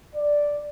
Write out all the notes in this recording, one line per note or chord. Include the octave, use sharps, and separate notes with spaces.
D5